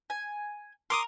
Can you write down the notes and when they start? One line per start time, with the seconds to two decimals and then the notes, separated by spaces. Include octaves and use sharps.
0.10 G#5
0.90 A#4 C6 D6 D#6